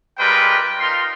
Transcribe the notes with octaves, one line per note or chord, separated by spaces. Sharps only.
G3 G#3 F4 A#4 B4 G5
D#4 F4 A#4 C6